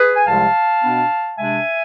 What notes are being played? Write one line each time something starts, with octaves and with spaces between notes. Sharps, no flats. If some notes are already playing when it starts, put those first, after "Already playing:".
Already playing: G#4 B4
G#5
C2 C3 F3 G#3 F5 A5
B2 B3 D4
C3 G#3 D4 E5 G#5